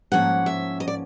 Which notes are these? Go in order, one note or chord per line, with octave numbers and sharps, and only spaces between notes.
G#2 F3 A#3 C#4 F#5
E5
D#5
D5